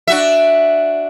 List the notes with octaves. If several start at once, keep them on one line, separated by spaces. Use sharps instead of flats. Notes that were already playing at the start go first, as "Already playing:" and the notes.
D4 F#4 E5